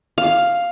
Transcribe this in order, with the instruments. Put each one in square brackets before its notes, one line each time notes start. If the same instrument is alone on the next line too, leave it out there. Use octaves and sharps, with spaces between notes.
[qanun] F5